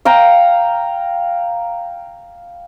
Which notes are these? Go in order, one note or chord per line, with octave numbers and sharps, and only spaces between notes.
F5 G5 A#5